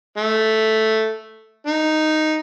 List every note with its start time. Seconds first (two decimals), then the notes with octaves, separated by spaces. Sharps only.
0.17 A3
1.67 D#4